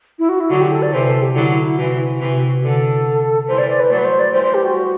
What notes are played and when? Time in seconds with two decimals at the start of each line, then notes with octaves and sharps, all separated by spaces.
0.19 E4
0.29 F#4
0.40 E4
0.50 D3 F#3 F#4
0.61 G4
0.72 A4
0.82 D5
0.92 C3 E3 C5
1.07 A4
1.22 G4
1.35 D3 F#3 E4
1.50 E4
1.64 E4
1.78 C3 E3 F#4
2.20 C3 E3
2.63 D3 A4
3.48 E3 G3 C5
3.58 D5
3.69 D5
3.80 B4
3.90 F#3 A3 D5
3.98 B4
4.05 C5
4.19 D5
4.32 E3 G3 C5
4.43 C5
4.54 G4
4.65 F#4